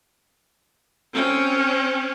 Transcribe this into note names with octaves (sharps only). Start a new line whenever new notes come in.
C4 C#4